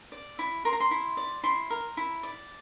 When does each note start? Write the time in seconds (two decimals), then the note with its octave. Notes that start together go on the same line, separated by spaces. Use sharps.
0.12 D5
0.39 E4
0.65 A#4 C6
0.73 A#5
0.80 C6
0.91 E4
1.17 D5
1.43 E4 C6
1.70 A#4
1.97 E4
2.23 D5